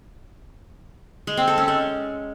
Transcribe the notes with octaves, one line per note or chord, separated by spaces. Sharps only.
G#3
C4
A4
C#4
G#3